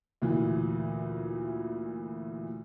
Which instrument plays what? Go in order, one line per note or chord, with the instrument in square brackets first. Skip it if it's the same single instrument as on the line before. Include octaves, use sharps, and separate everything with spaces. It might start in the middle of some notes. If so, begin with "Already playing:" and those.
[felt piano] D2 A#2 E3